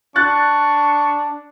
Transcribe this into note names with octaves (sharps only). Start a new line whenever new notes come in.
D4 C#6 F#6 A6